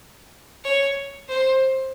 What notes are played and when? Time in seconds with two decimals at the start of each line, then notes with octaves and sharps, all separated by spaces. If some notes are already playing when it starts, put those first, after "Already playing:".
0.64 C#5
1.29 C5